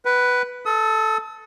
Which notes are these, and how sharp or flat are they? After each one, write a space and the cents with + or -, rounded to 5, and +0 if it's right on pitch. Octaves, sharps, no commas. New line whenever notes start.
B4 +0 F#5 +40
A4 +0 D#6 +40